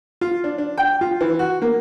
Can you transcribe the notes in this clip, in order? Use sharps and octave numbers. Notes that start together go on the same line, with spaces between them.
F4
D4
D4
G5
F4
E3
F#4
A#3